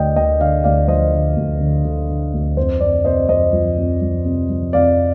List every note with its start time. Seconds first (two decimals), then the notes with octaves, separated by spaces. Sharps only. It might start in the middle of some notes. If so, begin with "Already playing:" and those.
Already playing: D2 D3 D5 D#5 G5
0.16 D2 D#5 G5
0.40 D3 D5 F5
0.64 D2 D5 F5
0.88 F3 C5 D#5
1.12 D3
1.36 D2
1.61 D3
1.85 D3
2.09 D3
2.34 D2
2.57 F2 C5
2.80 F2 D5
3.05 C3 C5 D#5
3.29 F2 C5 D#5
3.53 F3
3.78 F2
4.02 F3
4.25 C3
4.50 F3
4.73 F2 D5 F5